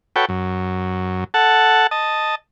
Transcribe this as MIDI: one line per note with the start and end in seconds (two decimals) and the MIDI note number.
0.16 0.25 66
0.16 0.25 69
0.16 0.25 71
0.16 0.25 73
0.16 0.25 79
0.29 1.24 42
1.34 1.87 69
1.34 1.87 78
1.34 1.87 81
1.91 2.35 75
1.91 2.35 81